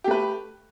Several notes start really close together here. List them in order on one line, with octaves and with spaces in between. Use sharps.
G4 A3 B4